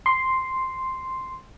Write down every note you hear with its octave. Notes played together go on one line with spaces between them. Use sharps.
C6